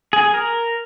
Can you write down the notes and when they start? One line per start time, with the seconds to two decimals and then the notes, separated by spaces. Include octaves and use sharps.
0.13 G#4
0.34 A#4